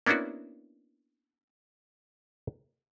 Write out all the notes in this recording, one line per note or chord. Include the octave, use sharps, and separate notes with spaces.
A#3 B3 C#4 D4 E4 F#4